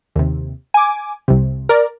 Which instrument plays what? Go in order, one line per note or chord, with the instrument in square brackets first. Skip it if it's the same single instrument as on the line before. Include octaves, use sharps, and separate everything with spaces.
[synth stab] D#2 C3
G#5 D6
C2 C3
A#4 D5